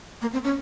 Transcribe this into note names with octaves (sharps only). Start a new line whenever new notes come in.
A#3
C4
C#4